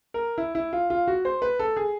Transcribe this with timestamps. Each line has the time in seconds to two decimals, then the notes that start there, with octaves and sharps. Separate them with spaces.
0.14 A#4
0.38 E4
0.55 E4
0.73 F4
0.90 F4
1.07 F#4
1.25 C5
1.42 B4
1.59 A4
1.76 G#4